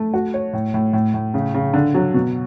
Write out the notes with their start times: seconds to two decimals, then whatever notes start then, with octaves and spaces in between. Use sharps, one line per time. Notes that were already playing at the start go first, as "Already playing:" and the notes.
Already playing: A3
0.14 F#4
0.34 C#5
0.53 A2
0.74 A2
0.93 A2
1.14 A2
1.34 C#3
1.54 C#3
1.74 D3
1.95 F#3
2.14 B2